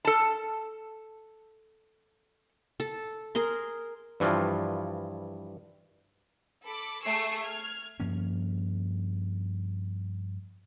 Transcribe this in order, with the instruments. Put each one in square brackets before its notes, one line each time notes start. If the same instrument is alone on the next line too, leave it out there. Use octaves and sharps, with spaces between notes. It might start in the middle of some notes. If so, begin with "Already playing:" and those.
[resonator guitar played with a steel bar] A4 A5
[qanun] A4
G#4 A#4 C6
[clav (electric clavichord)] G2 E3 F3 F4
[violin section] A4 B5 D6
A3 G#4 C#6 E6 C7
F6 G#6
[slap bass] G2 F3 A#3 C#4